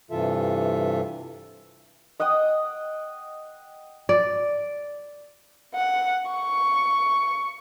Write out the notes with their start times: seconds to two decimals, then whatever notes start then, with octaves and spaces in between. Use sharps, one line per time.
0.11 G2 C3 E3 F4 A4 E5
2.20 D#5 F#5 G5 D#6
4.09 D5
5.75 F#5
6.31 C#6